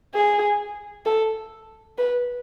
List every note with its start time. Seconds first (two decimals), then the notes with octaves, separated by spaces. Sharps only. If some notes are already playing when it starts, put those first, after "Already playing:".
0.15 G#4
1.06 A4
1.98 B4